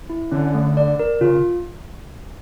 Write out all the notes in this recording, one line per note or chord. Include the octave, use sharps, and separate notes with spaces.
E4
D3 C#4
A3
D5
A#4
C#3 F4